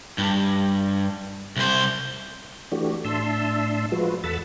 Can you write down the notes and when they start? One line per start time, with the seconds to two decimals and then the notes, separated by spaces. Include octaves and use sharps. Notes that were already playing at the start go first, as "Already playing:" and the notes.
0.18 G2
1.56 C2 C5
2.72 E3 A3 D4 F#4 G4
3.05 A2 D4 E5 A5 C6 E6
3.92 F3 G#3 F4 F#4 B4
4.24 E2 A4 F#5 B5 E6 A6